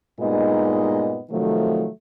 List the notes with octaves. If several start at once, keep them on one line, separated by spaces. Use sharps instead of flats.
G2 A#2 G#3 B3 D#4 D#5
C3 D#3 F3 F#3 A3